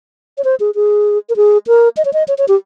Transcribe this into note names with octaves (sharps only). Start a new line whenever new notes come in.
C#5
C5
G#4
G#4
A#4
G#4
A#4
D#5
C#5
D#5
C#5
C#5
G4